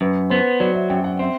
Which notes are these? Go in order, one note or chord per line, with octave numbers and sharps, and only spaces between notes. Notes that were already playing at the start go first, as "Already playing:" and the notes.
F#2 B4
B3 C5
F#3 D5
E5
F#2 G5
F#5
C4 E5